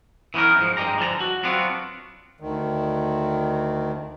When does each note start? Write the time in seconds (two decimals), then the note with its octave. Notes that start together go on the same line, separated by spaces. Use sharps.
0.34 E3 B3 C#4 D#4 A#4
0.58 G#2 F3
0.77 G2 G#3 D#4 G4 A#5
0.99 D3 F3 A5 A#5
1.20 F#4
1.43 F#3 B3 C4 D4 F4 F#4
2.40 D2 D#3